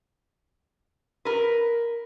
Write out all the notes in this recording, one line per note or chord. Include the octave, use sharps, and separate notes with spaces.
A#4 B4